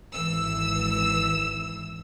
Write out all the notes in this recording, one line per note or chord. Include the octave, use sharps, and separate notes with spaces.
G#1 E3 E6